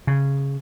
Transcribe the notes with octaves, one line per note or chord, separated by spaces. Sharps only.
C#3